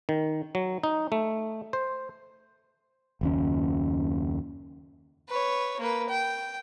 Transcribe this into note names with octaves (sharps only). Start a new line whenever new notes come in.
D#3
F#3
D#4
A3
C5
F#1 D#2 C#4
B4 C#5
A#3 B4
G5